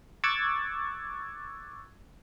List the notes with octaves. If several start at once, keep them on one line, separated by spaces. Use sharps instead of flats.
C#6 D6 E6 F#6 G#6 A6